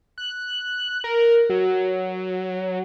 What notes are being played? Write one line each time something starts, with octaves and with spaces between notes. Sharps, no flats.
F#6
A#4
F#3